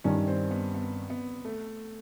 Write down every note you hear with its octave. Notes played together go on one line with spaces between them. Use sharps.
G2 D#3 G3 C#4
C4
B3
B3
B3
A3